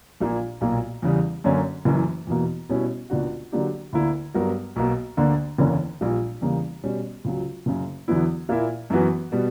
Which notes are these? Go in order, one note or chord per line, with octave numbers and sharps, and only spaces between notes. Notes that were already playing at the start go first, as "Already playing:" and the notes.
A#1 A#2 A#3
B1 A#2 A#3
E2 C#3 G3
F#2 D3 A#3 C#4
F#1 F#2 E3
E2 B2 A#3
B2 G3 C#4 E4
C#2 B2 A#3 D4 F#4
D3 F#3 A#3 D4 G4
D2 D3 A#3 E4 A#4
G2 F#3 B3 F#4 A#4
B1 B2 A#3
D2 D3 A#3 D4
F#1 E2 D3 A#3 C#4
A#1 A#2 G3
E2 C#3 G3 A#3
B2 G3 C#4
C#2 C#3 F#3
F#1 F#2 C#3
E2 D3 F#3 B3 E4
A#2 A#3 E4 A#4 E5
F#2 E3 B3 F#4 B4
B2 G3 B3